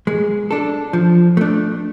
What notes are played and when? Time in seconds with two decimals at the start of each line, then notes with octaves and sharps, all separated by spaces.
0.07 G#3
0.51 D4 A4
0.93 F3
1.37 A3 D4